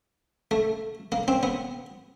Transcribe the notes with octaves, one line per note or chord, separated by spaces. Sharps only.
A3
A#3
C4
B3